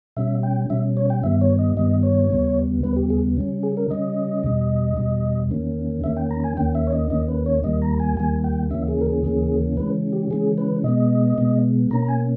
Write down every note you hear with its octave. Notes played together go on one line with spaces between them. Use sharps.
B2 G3 C#4 E5
G5
B2 G3 C#4 E5
C#5
G5
G2 D#3 G3 B3 E5
C#5
D#5
G2 D#3 G3 B3 D#5
C#5
D#2 C#3 G3 B3
D#2 C#3 G3 B3 B4
G4
G#4
C#3 G3 C#4
G#4
A#4
C#3 G3 C#4 D#5
E2 B2 G3
E2 B2 G3
E2 D#3 A#3 C#4
E2 D#3 A#3 C#4 E5
G5
A#5
G#5
D#2 D#3 A#3 C#4 G5
E5
C#5
D#5
D#2 D#3 A#3 C#4 D#5
B4
C#5
D#2 D#3 G3 A#3 D#5
A#5
G#5
D#2 D#3 G3 A#3 G#5
G5
D#2 C#3 E3 A#3 C#4 E5
G#4
A#4
G#4
D#2 C#3 E3 A#3 C#4
C#3 E3 G#3 C#4 B4
G4
C#3 E3 G#3 C#4 G#4
B4
B2 G#3 B3 D#5
B2 G#3 B3
B2 A#3 C#4 A#5
A#5
G#5